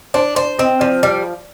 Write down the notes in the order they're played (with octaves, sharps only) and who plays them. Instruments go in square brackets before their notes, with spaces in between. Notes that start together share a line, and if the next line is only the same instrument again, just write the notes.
[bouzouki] D4 [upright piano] C5
[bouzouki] C5 [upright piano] D5
[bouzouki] C4 [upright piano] D#5
[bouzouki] F3 [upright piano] D5
[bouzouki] G3 [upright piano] D5